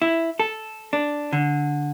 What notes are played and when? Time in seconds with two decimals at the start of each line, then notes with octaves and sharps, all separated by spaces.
0.02 E4
0.40 A4
0.93 D4
1.33 D3